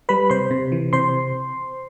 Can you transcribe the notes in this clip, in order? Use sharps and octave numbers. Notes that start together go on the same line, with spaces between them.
G3 B4 B5
C3 C5 C6
C3
E3
C3 C5 C6